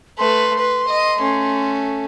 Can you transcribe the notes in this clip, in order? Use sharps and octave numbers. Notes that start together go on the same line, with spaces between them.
A3 B4 C6
B4
D#5
A3 C#4